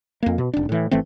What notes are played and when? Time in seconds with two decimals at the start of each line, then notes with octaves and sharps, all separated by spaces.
0.23 F2 A#3
0.38 B2
0.53 F1 D4
0.69 A2 E3
0.91 G#1 E3 A3 C4